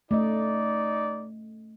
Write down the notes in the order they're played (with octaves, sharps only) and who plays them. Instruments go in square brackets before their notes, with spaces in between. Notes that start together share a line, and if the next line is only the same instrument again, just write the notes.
[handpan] A3 C#4 D#5 [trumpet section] D#4 D5